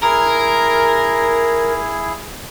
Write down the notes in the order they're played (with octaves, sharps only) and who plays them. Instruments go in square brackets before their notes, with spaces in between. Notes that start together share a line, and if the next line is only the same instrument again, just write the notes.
[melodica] E4 G#4 [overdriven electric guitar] A#4